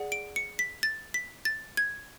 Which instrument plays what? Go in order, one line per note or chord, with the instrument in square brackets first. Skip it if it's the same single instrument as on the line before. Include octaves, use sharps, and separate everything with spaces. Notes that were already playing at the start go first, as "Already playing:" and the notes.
Already playing: [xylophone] G#4 D5 F#5
D7
C#7
B6
A6
B6
A6
G#6